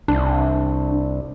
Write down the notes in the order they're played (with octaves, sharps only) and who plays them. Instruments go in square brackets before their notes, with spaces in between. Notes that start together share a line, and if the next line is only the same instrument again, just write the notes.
[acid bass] C2 [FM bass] D4